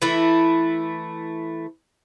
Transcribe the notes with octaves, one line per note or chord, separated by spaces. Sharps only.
E3 A3 E4